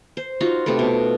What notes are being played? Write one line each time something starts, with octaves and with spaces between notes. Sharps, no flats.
C5
D#4 F4 F#4
C3 A3 A4 B4
B2